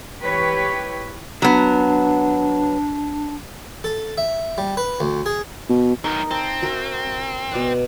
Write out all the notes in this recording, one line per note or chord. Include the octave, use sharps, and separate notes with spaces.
E3 E4 G4 B4 C#5
F#3 B3 D4
A4
E5
G3
B4
D2
G#4
B2
F#2 D#3 D#4 A#4
C4 A5
F#4 A#4 E5
B2 D5 F#5